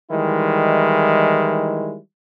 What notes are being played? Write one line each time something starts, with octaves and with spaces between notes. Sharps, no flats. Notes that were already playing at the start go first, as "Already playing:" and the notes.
D#3 E3 G3 G#3 E4